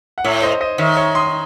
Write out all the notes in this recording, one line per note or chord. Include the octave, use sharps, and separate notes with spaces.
F#5
A2 C#5 E5
C5 D#5
C5 D#5
D#3 C#5 E5
C#5 E5
C6 D#6